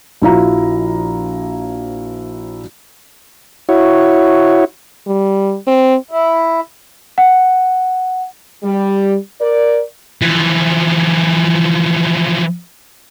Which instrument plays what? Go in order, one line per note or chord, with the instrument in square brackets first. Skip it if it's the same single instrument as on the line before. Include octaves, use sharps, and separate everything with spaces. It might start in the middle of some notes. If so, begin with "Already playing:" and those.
[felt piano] A#1 F3 E4 F#4 F5 A#5
[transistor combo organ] E4 F#4 C#5
[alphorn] G3
C4
[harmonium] E4
[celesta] F#5
[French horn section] G3
A#4 D5
[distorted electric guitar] E3 F3